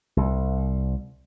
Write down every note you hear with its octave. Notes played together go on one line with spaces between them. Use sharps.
C2